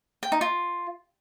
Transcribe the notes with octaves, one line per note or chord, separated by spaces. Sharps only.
G5
D#4
F4